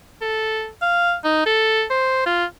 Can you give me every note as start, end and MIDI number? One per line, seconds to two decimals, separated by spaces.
0.21 0.69 69
0.82 1.15 77
1.24 1.43 63
1.46 1.84 69
1.90 2.25 72
2.26 2.45 65